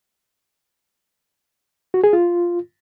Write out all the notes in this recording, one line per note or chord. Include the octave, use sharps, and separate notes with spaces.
F#4
G#4
F4